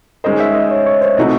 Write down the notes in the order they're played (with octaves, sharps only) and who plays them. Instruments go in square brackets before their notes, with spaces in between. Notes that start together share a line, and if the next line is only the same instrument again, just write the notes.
[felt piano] D#3 G#3 C#4 G#4 C5 [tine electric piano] D#5
[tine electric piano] E5
D#5
C#5
C#5
C5
[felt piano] C3 E3 A3 D#4 F#4 [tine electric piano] D#5